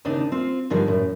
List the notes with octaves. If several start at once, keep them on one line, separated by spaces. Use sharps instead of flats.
D#2 C#3 C4 D4 D#4
C4 F4
G2 D3 D#3 F3 G3
F#2 A2